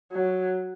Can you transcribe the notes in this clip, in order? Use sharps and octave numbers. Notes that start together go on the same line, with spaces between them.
F#3